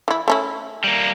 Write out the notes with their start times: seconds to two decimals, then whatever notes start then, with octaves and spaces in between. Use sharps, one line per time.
0.08 E3 E4
0.28 A3 C#4 E4
0.84 G3 A#3